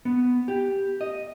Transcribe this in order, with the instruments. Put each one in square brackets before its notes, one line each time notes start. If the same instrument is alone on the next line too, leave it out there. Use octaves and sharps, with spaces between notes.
[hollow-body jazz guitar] B3
G4
D#5